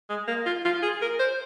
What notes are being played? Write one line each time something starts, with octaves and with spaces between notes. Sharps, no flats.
G#3
A#3
F4
F4
G#4
A#4
C5